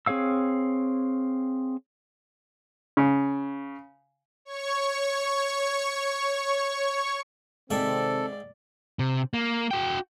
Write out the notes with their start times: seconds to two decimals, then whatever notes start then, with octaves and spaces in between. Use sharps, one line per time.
0.06 C4 G#4 C#5 F5 E6
2.97 C#3
4.45 C#5 C#6
7.71 G#2 C3 D#3 C4 A4 D5 E5 G5
8.99 C3
9.34 A#3
9.71 F#4 G5